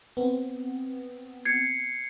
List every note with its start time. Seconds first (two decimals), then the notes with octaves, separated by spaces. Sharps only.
0.17 B3 C4
1.45 G#6 C7 C#7